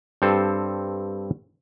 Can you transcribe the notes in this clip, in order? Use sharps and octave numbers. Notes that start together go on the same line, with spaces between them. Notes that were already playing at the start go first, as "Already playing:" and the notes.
G2 C4 A4 C5